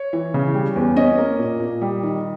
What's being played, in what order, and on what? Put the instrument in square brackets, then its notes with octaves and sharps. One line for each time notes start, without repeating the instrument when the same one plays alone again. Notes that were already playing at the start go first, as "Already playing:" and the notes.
Already playing: [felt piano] C#5
E3
C#3
G3
E2
C#4 D#5
A#3
A#2
A#2
G3
D#3